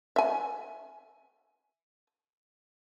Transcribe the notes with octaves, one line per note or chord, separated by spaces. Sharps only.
E5 G#5